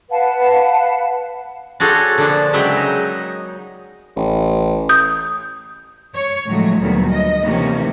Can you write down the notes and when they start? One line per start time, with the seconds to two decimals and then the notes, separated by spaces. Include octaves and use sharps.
0.10 B4 F5 F#5 A5
1.80 D4 F#4 G#4 A4 C5 C#5
2.18 D3 F3 A#3 D4
2.53 C#3 F#3 G#3 E5 F#5 G5
2.77 D#4
4.16 A1
4.89 D#6 G6
6.14 C#5
6.46 A2 D3 F3 F#3 G#3 A3
6.80 D2 A#2 D#3 F#3 G3 B3
7.11 D#5
7.44 C3 D#3 E3 A3 A#3 C#4